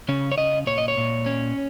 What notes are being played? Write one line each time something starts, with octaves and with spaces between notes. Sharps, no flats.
C#3 C#4
C#5
C#3 D#5
A#2 C#5
D#5
C#5
A#2
C#4